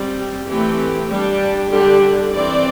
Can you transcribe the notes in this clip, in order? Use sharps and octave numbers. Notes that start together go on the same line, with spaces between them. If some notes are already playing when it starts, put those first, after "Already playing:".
Already playing: G3 C4
G4
E3 A3 C4 G4
G3 D4 G4
D3 G3 D4 G4
E3 C4 D5